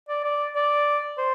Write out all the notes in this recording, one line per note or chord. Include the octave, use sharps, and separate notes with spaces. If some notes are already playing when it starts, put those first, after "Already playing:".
D5
D5
D5
C5